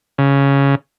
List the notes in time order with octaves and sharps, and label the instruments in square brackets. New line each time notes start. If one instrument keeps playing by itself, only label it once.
[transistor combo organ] C#3